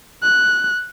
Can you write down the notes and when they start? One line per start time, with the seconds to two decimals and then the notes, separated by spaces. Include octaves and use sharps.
0.23 F#6